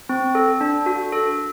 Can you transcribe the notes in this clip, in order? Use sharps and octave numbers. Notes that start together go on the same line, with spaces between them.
C4
A4
D4
F#4
A4